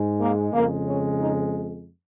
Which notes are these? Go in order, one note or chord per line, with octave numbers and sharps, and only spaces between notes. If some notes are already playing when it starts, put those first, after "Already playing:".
Already playing: G#2 G#3
A#3
F2 C#3 G#3 A#3
C#4
D#4